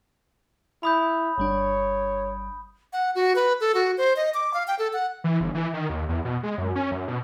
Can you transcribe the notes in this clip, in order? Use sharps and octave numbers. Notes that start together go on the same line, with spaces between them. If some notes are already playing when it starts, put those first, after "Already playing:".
E4 B5 D#6 G6
G1 G3 D4 C#5
F#5
F#4
B4
A4
F#4
C5
D#5
D6
F5
G5
A4
F#5
E3
G1
E3
D#3
D#2
E2
B2
G#3
F#2
C#4
F#2
B2